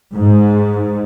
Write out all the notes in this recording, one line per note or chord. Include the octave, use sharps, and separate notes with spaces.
G#2